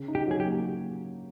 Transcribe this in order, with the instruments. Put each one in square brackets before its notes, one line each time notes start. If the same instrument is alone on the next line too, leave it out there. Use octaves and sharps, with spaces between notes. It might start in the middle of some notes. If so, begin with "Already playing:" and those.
Already playing: [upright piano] C#3
D#4
[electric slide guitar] G4
[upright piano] F#3 [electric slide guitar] G#4
[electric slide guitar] G4
[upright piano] A#3